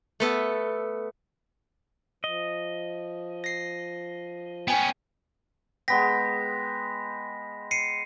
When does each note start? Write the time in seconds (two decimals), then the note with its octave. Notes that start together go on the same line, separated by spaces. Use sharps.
0.20 A3 B3 A4
2.24 F3 D#5
3.44 A#6 C7
4.68 B3 C#4 G5 G#5
5.88 G#3 B3 G5 A#6 B6
7.71 C7 C#7 D#7